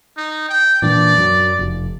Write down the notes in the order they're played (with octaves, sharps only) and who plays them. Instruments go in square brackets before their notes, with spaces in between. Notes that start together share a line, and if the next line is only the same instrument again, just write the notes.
[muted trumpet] D#4
G5
[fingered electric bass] A#2 E3 D4 [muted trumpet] D5
[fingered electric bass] F#2 F#3
F1